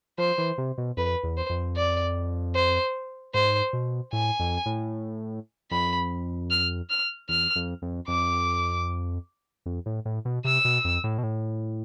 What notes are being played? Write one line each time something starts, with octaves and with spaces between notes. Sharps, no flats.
F3 C5
E3
C3
B2
F2 B4
E2
C5
F2
D5
C5
G#2 C5
B2
A2 G#5
F2
A2
F2 B5
F6
F6
E2 F6
F2
F2
F2 D6
F2
A2
A2
B2
C3 E6
B2
F2
A2
B2
A2